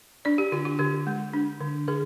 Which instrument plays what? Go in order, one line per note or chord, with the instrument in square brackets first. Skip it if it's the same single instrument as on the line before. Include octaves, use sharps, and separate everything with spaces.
[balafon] D4 D5
G4
D3 F4
F4
D3 G4
G#3
D4
D3
D3 G#4